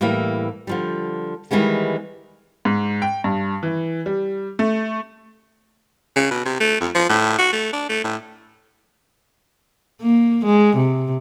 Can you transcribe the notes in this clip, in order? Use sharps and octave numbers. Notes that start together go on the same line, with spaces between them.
A2 E3 G3 A#3
D3 F3 G3
D#3 E3 G3 G#3 B3
G#2
G5
G2
E3
G3
A3
C#3
B2
C3
A3
F2
F3
A2
F#4
A3
D4
A3
A2
A#3
G#3
C3